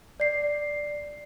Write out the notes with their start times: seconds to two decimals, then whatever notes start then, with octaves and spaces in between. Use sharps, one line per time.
0.20 D5 C7